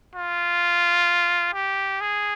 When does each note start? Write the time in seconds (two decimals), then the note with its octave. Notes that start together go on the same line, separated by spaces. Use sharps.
0.16 F4
1.54 G4
2.01 G#4